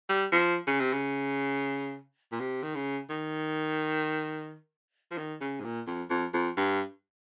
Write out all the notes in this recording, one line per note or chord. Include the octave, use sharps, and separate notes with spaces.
G3
F3
C#3
C3
C#3
A#2
C3
D#3
C#3
D#3
F3
D#3
C#3
G#2
A#2
F2
F2
F2
G2